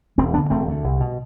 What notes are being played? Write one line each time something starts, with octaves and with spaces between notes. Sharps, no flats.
E1 A3 C4
D2 D3 B3 D4
E1 A3 C4
D2 D3
C2
B2